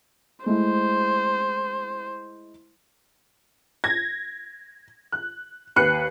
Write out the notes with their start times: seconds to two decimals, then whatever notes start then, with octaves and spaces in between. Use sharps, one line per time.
0.46 G#3 A3 E4 C5
3.84 G#6 A#6
5.12 F#6
5.76 D#2 B4 F#6 C7 C#7